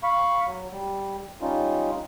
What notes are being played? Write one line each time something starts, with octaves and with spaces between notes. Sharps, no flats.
F5 B5 C#6
F#3
G3
G3 C#4 D#4 F4